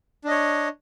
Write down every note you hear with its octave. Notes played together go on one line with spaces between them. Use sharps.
D4 C#5 D#5